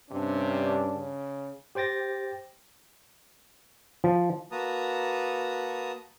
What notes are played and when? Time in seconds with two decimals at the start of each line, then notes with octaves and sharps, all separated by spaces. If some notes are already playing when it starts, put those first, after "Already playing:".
0.11 G2 C3 C#4 D4
0.93 C#3
1.75 G4 C5 G5 A6 A#6
4.04 F3
4.51 A#3 F#4 B4 A5 A#5 D#6